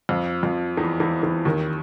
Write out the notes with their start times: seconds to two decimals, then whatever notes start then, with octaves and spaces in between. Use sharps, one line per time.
0.09 F2 F3
0.43 F2 F3
0.77 E2 E3
1.00 E2 E3
1.23 E2 E3
1.45 D#2 D#3